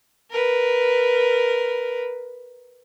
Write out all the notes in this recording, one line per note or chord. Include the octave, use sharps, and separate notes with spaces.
A#4 B4